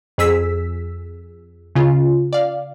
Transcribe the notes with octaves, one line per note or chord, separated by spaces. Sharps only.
F2 G#4 E6 B6
C#3 F4
D5 F5